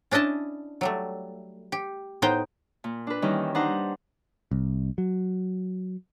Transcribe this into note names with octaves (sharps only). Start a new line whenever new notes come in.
C#4 D4 E4 D#5 A5
F#3 G3 A3
G4
A2 B3 D#4 C5 G5
A#2
D4 B4
D#3 E3 G3 C#4 D#4
D4 D#4 B4 C5 F#5 A#5
C2
F#3